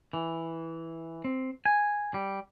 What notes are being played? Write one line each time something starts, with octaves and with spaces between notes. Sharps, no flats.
E3
C4
G#5
G3